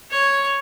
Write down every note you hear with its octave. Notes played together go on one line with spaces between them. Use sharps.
C#5